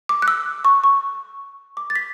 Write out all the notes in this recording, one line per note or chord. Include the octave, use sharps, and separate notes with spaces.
D6
F#6
E6
C#6
C#6
D6
A6
B6